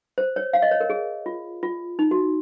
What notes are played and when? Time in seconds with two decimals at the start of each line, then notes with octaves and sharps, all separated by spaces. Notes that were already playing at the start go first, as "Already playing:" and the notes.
0.18 C5
0.36 C#5
0.53 F5
0.62 D#5
0.71 C#5
0.80 A#4
0.90 G#4
1.26 F4
1.63 F4
1.99 D#4
2.11 F#4